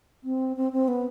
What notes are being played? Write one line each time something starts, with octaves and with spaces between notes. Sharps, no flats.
C4
C4
C4
B3